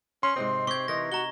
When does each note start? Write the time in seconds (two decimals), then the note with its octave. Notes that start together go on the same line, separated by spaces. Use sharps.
0.23 C#4 C6
0.36 G#2 C3 C4 D#5
0.67 C4 G4 C#6 G#6
0.88 E3 D#4 A#4 A#6
1.12 F#4 A#5 G7